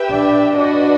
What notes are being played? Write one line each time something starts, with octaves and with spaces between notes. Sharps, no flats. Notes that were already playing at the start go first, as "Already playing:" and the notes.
Already playing: G4 B4 E5 G5
D4
D4 F#4 B4 D#5